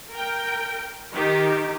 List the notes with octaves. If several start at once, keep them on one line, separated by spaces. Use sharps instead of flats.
A#4 G5
D#3 D#4 G4